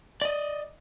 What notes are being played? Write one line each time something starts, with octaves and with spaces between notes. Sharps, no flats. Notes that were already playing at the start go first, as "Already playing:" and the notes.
D5 D#5